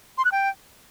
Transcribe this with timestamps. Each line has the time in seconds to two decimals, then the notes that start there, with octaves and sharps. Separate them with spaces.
0.18 C6
0.25 F#6
0.32 G5